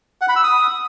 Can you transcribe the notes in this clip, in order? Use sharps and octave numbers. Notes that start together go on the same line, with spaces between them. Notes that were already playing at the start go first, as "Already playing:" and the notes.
F#5
B5
E6
D#6